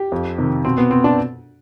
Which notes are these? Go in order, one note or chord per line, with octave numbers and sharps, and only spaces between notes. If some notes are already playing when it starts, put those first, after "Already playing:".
Already playing: G4
F2
C3 D#3
B2 C4
B3
C4
D4